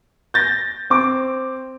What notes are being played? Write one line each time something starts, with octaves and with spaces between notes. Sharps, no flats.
G6 A6 A#6
C4 D6